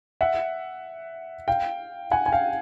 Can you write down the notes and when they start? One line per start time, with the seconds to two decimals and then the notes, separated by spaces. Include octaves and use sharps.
0.21 E5 F#5
1.48 F5 G5
2.11 F#5 G#5
2.26 G#5
2.32 F5 G5